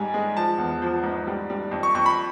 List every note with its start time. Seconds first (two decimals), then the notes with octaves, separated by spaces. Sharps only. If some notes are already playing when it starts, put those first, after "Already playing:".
Already playing: G#2 G3 G#5
0.14 G#3
0.37 F3 A5
0.58 E2
0.82 F3
1.03 G#2
1.27 G3
1.50 G3
1.71 F2
1.83 C#6
1.95 F2 C#6
2.06 B5